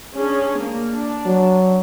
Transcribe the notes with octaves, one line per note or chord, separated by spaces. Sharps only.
C#4 D4 G#4
A#3
D4
F#3